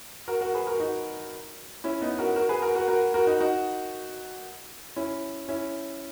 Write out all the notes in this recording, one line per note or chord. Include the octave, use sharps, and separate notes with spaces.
F#4 A#4
F#4 A#4
G#4 B4
F#4 A#4
D#4 F#4
C#4 E4
B3 D#4
F#4 A#4
F#4 A#4
G#4 B4
F#4 A#4
F#4 A#4
F#4 A#4
F#4 A#4
D#4 F#4
D#4 F#4
C#4 E4
C#4 E4